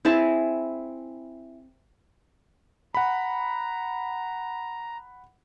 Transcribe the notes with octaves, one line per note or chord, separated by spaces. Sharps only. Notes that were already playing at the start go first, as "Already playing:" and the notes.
C4 E4 G#4 A5
F#5 A#5 B5